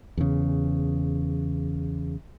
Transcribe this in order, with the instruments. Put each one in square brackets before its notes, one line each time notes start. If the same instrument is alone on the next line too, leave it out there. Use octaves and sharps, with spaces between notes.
[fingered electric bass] E2 C#3